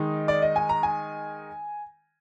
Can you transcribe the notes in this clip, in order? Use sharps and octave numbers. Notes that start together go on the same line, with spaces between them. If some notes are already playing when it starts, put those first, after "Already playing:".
Already playing: D#3 G#3 D#4
D5
D#5
G#5
A#5
G#5